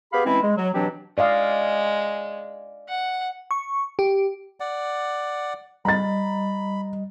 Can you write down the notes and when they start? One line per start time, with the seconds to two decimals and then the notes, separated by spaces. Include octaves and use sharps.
0.13 B3 G4 G#4 F5 B5
0.25 E3 G#3 C4 C#4 E4
0.42 G#3
0.57 F#3
0.74 B2 E3 F#3 C4 D4 G4
1.18 G#3 D5 D#5 F5
2.89 F#5
3.51 C#6
3.99 G4
4.60 D5 F#5
5.85 G3 D#5 A#5 B5 A6